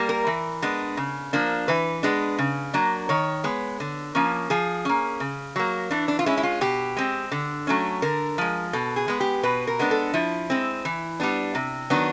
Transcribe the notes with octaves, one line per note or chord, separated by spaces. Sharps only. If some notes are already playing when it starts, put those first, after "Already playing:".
Already playing: G3 A#3
A#4
E3
G#3 B3 D4
C#3
F3 A#3 D4
E3 B4
G#3 B3 D4
C#3
F#3 A#3 D4
D#3 C#5
G#3 B3
D3
F3 A#3 C#4
F3 G#4
A#3 C#4
C#3
F#3 A#3
E3 D4
D4
F4
G#3 C#4 E4
E4
F4
B2 G4
G#3 C4
D3
F#3 A3 C#4
D3 A#4
F3 G#3
B2 A4
G#4
G#3 B3
G4
B2 B4
A#4
G#3 B3 D4
A4
F3 E4
G#3 C4
E3
G3 B3 D4
C3
D#3 F#3 B3 D4